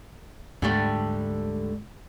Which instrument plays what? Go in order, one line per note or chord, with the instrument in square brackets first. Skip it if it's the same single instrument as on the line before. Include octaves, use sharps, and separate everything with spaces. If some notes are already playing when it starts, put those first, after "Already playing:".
[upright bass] D2 G#2 [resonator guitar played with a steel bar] D3 G3 A3